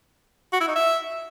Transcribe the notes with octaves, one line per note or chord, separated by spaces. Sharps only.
F#4
E4
D#4
E5